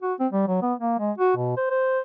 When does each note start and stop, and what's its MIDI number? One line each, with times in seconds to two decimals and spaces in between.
0.02 0.13 66
0.20 0.28 60
0.33 0.45 55
0.48 0.58 54
0.62 0.74 59
0.80 0.97 58
0.99 1.12 56
1.18 1.33 66
1.36 1.57 47
1.57 1.69 72
1.70 2.00 72